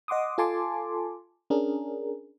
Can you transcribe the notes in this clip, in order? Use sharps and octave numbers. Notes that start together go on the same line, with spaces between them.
D#5 F#5 C6 D6 D#6
F4 A4 G#5 A5 C6 D6
C#4 D4 G#4 A#4